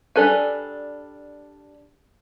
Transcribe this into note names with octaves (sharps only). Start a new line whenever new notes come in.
G3 D4 A4 B4 G#5